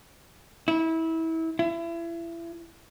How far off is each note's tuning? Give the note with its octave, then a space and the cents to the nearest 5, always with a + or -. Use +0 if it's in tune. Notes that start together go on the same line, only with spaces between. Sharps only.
E4 -25
E4 +30